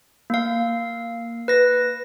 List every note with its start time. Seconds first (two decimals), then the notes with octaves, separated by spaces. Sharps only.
0.30 A#3 F5
1.48 B4 A#6